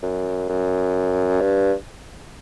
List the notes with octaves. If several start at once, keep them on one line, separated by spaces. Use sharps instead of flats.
F#2
F#2
G2